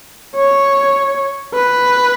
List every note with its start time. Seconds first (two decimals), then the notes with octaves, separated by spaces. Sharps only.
0.36 C#5
1.54 B4